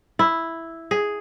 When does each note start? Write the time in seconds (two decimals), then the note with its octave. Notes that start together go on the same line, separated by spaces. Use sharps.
0.19 E4
0.91 G#4